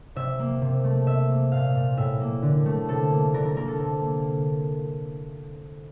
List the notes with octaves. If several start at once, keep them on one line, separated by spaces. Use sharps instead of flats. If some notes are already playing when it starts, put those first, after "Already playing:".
C3 E5
A#3
C3
A3
C3 E5
A#3
A#2 F5
A#2
A2 E5
A#3
D3
A3
C3 A4
A#3
D3 A#4
A#4
A#3 A#4
A4
C3
A#3